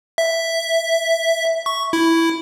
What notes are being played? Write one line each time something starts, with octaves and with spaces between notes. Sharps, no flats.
E5
C#6
E4